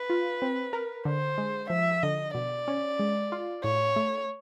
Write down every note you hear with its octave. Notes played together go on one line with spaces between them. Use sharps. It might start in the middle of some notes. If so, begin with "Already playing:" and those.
Already playing: B4
F4
C4
A#4
D3 C5
G#3
F3 E5
D3 D#5
B2 D5
C#4
G#3
F4
A2 C#5
A3